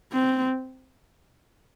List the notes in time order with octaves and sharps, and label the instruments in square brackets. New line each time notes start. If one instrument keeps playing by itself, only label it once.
[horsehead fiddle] C4